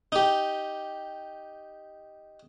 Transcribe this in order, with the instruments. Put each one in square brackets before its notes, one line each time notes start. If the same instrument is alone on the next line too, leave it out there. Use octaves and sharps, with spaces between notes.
[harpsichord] D#4 G4